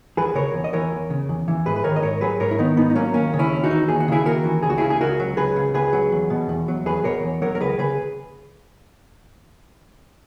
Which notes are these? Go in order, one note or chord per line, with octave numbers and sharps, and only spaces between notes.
E2 G#4 B4
C#3 A#4 C#5
E2
D#5
E3 A#4 C#5
E2
C#3
E2
E3
G#2 G#4 B4
B4
D#3 A#4 C#5
D#5
G#2 A#4 C#5
F#3 G#4 B4
G#2 A#4 C#5
E4
D#3 B3 D#4
G#2 B3 D#4
D#4
F#3 A#3 C#4
D#2 A#3 C#4
C#3
C#4 E4
D#2
D#4 F#4
E3
D#2 G#4
F#4
C#3 E4 G#4
D#2 F#4 A#4
E3
C#2 G#4
F#4
C#3 E4 G#4
G#4
C#2 F#4 A#4
F#3
C#2 G#4 B4
C#3
C#2 G#4 B4
F#3
E2
B2
E2
F#3
E2 G#4 B4
B2 A#4 C#5
E2
F#3 A#4 C#5
A#4
C#2 G#4 B4
C#3 G#4 B4